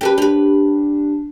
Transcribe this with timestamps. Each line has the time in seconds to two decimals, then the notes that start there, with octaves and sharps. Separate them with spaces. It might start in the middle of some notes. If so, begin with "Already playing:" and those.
0.01 C#4 G4 A4 B4
0.18 D4 G4 B4